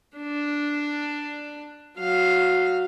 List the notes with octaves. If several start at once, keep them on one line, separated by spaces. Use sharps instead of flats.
D4
F#3 F5